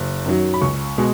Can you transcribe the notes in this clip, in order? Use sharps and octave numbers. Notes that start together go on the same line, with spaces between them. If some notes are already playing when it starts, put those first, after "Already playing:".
Already playing: F#1
F#2 D#3 F#3
B5
C#2 C#6
B2 G#3